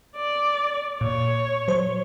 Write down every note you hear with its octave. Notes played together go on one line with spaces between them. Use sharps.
D5
A#2 C#5
F#3 C5